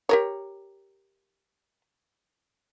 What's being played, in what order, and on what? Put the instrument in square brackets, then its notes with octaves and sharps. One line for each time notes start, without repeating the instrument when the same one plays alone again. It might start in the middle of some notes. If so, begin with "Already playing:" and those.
[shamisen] G4 A#4 C#5